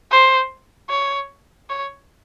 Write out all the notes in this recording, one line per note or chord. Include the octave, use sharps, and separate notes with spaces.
C5
C#5
C#5